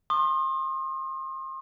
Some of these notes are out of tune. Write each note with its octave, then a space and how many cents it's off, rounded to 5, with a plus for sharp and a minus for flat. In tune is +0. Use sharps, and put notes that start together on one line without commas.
C6 +35 D#6 -35